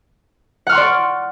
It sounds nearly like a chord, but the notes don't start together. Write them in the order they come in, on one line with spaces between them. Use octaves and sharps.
F#5 F6 C#6 C6 D5